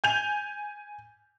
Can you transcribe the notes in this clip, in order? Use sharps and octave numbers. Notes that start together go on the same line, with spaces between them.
G#5 G6 F7